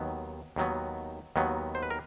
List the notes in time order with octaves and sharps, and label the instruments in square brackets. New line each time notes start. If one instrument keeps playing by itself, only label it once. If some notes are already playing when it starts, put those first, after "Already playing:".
Already playing: [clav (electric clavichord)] D#2 D#3 F#3 B3
D#2 D#3 F#3 B3
D#2 D#3 F#3 B3
C5
B4
A#4